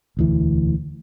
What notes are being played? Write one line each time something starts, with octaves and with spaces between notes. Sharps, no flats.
E1 D2 E3